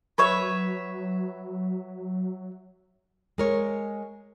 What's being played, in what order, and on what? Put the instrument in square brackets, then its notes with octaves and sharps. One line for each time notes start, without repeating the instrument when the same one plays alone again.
[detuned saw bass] F#3 [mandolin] B4 C#5 E5
[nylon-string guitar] G#3 A#4 C#5